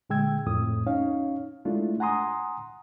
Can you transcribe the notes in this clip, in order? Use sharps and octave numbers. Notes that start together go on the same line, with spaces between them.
A#2 D3 G#3 G5 E6 G#6
F2 A2 D#6
C#4 D#4 C#5 F5
G#3 A3 D4 E4 F4
F#5 G#5 A#5 C6 D#6